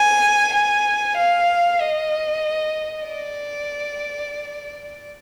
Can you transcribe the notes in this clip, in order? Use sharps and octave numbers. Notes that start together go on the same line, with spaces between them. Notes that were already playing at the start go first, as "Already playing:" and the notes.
Already playing: G#5
G#5
F5
D#5
D5